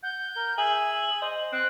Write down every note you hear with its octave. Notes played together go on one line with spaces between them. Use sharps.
F#5 G6
A#4
G#4 E5 G#5 E6 F#7
C5 D#5
C4 F#6